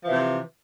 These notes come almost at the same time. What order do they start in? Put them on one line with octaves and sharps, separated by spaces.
F3 E3 C3